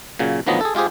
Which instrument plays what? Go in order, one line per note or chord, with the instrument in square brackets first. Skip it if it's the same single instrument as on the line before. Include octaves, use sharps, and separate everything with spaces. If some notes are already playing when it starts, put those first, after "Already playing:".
[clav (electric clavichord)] A#2 C#3 F#3
D2 D#3 F3 F#3 B3 D#5
G#4 A4
G#3 F4 G4 G#4 C5